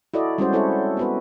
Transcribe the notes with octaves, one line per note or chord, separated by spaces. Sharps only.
E4 F#4 A4 D5 D#5
G3 G#3 C#4 E4 F#4 C5
C4 E4 A4 C5 C#5 E5
B3 F#4 B4